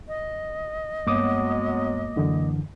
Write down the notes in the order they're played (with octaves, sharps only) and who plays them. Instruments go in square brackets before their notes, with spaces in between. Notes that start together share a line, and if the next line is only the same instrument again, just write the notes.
[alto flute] D#5
[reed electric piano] G2 [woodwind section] F#3 G#3 B3 [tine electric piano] A#3 D6 D#6
[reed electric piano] F#2 D3 E3